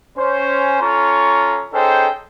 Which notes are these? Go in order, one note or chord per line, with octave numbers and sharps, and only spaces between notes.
C#4 C5
C#4 F4 A4 A#5 C#6
C#4 D#4 G#4 A4 C5 G5